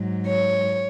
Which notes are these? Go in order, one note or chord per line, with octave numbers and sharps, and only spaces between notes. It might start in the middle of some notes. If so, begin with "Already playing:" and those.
Already playing: G#2 F#3
C#5